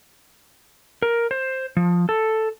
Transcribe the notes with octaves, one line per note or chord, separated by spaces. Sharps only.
A#4
C5
F3
A4